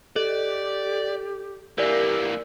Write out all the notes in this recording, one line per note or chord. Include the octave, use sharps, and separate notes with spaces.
G4 A4 D5
E3 A#3 G4 A#4 D5 E6